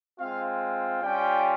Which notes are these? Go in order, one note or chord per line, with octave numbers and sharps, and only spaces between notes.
G#3 C4 F4 F5
G3 C#4 F4 G5